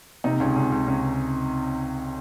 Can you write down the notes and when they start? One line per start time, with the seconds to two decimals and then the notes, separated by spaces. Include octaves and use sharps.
0.24 C3 D#4
0.40 C#2 C#4
0.56 C#2 C#4
0.72 C#2
0.87 C#2 C#4